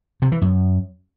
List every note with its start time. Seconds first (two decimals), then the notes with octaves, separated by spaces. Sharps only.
0.22 C3
0.32 E3
0.42 F#2